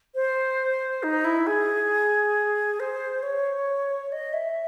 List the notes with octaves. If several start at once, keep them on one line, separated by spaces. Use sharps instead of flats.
C5
D#4
E4
G#4
C5
C#5
D#5
E5